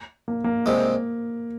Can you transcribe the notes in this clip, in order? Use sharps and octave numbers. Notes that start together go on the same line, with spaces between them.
A#3
A#3
C2 C3 G#3 A#3